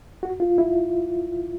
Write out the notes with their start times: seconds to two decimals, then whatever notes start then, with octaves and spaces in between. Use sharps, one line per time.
0.23 F#4
0.40 F4
0.58 E4